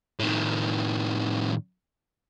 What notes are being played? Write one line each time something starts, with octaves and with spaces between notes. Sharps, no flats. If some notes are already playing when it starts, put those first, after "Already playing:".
A2 D#3